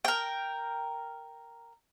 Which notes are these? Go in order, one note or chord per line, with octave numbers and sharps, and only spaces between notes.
A#4 G5